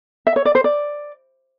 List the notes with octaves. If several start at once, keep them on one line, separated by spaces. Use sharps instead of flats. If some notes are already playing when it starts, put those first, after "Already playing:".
E5
C#5
D5
C5
D5